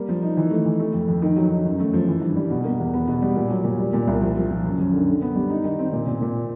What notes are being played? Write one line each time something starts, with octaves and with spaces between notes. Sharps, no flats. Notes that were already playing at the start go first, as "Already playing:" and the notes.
Already playing: G3 A#3
F3
D#4
E3
A3
E3
A3
F2
F2
D#3
F#3
D#3
F#2
A3
F3
E3
G2
G3
B2
A#3
E2
B3
B2
G3
A#2
F#3
A#2
G3
A#2
C2
F3
F3
F3
F#2
F#2
D3
D3
B3
G3
D#4
D#3
C4
A#2
A#2
A#2